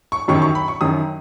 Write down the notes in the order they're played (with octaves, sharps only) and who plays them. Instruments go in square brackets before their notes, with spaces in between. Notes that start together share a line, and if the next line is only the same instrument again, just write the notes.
[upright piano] C#6
F#2 D#3 F#3 C#6
C#6
B5
C#6
F#2 D#3 F#3 D#6